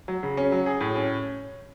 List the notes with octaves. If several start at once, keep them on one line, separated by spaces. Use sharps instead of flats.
F#3
C#3
C#4
F#3
G#4
A2
C#4